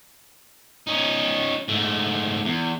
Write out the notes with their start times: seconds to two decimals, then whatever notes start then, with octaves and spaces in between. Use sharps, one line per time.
0.87 C#4 D#4
1.68 G#2 A3
2.45 E2